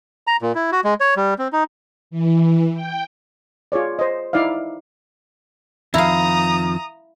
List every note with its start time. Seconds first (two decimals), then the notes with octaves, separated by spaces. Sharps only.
0.27 A#5
0.42 A#2
0.55 E4
0.72 F#4
0.84 G#3
1.00 C#5
1.17 G3
1.39 C4
1.53 D#4
2.11 E3
2.75 G5
3.72 F4 G#4 C#5 D5
3.99 C5 D#5
4.33 D#4 E4 D5 E5 F5
5.94 F2 D#3 F3 E4 F5 A#5 D#6